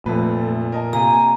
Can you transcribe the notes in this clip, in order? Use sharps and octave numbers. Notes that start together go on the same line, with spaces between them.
F1 F2 A#2 A3 B4
A#4 D#5 A5
C3 A#3 A4 G#5 A#5